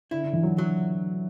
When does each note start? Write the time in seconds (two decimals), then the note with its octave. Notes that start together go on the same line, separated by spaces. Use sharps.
0.11 D3 E4
0.23 D3
0.33 E3
0.43 F#3
0.58 F#3